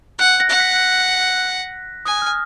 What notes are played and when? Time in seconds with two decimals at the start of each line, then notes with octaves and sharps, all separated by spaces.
0.19 F#5 F#6
0.40 A#6
0.50 F#5
0.60 B6
2.05 G#5 D#6
2.22 F6